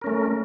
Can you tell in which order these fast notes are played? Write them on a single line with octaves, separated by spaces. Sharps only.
A#4 C#4 A3